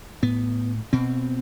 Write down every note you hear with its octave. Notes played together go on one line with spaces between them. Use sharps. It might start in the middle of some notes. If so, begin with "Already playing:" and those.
A2 B3
B2 C4